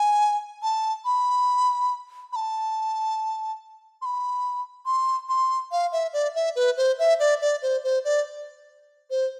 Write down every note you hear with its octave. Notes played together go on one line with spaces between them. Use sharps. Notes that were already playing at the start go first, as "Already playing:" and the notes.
Already playing: G#5
A5
B5
B5
A5
C6
B5
C6
C6
F5
E5
D5
E5
B4
C5
E5
D5
D5
C5
C5
D5
C5